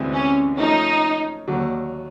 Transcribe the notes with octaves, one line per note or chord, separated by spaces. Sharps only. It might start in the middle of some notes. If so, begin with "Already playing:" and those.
Already playing: D2 C3 E3 G#3 C4
C#4
F3 A3 C#4 D#4
D#2 D3 F#3